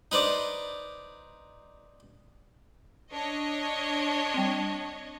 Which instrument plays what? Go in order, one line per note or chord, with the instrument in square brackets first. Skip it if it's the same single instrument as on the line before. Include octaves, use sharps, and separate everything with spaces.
[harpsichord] D#4 B4 C5 D5
[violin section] D4 C#5 D#5
[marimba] G3 C4